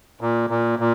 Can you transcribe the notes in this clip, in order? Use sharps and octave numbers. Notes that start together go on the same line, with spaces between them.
A#2
A#2
A#2